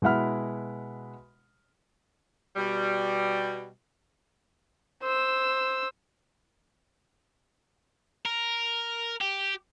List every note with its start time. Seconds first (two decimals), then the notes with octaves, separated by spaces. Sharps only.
0.02 B2 G#3 E4 F#5 B5 F6
2.56 B2 G3
5.02 C5 E6
8.25 A#4
9.21 G4